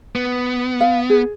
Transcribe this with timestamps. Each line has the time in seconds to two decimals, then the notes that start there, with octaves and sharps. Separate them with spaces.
0.15 B3
0.81 F5
1.10 G#4